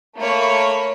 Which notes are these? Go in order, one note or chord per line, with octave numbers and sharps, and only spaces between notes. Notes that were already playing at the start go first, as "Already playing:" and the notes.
A3 A#3 C#5 B5